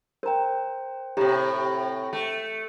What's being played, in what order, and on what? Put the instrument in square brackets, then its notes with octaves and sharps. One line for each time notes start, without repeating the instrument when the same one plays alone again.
[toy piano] A#4 A#5 [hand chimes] C5 G5
[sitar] A2 C3 [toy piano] G4 E5 A#5
[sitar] A3